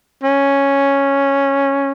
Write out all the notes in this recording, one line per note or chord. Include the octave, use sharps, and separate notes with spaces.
C#4